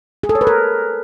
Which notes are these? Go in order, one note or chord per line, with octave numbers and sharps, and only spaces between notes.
G#4
A4
C#5
B4
A#4